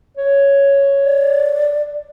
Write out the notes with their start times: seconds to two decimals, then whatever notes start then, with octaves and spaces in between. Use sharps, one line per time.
0.18 C#5
1.04 D5